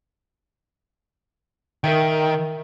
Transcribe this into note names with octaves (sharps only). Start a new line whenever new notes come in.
D#3 A#4 E5 G5